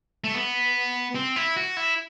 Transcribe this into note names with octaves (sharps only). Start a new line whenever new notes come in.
A3
B3
C4
E4
F#4
E4